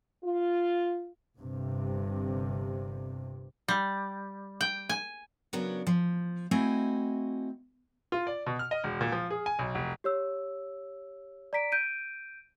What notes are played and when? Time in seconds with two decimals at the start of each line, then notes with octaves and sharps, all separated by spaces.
0.24 F4
1.38 G1 G2 C3
3.68 G3
4.61 G5
4.89 G#5
5.53 C#3 F#3 B3 D4 A#4
5.87 F3
6.51 A3 C4 E4 F#4 D#5 G#5
8.12 F4
8.27 D5
8.46 B2
8.59 F6
8.71 D#5
8.84 E1
9.01 A#2
9.12 F3
9.30 G#4
9.46 G#5
9.59 B1
9.75 F1
10.04 G4 C#5 E6
11.53 D5 A#5 B6 D7
11.72 G6 D7 D#7